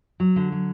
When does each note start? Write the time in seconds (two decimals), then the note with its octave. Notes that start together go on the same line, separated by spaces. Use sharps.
0.20 F#3
0.36 D3
0.52 F#3